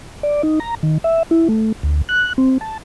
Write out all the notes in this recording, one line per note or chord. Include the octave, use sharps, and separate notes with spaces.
D5
D#4
A#5
D#3
E5
E4
A3
D2
F#6
C4
A5